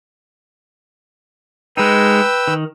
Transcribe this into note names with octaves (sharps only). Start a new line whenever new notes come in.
G#3 D#4 B4 G5 E6
D#3